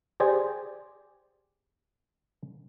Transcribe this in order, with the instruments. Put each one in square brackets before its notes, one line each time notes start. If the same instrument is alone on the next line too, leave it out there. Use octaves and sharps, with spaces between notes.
[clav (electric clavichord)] G4 G#4 C5 D5 G#5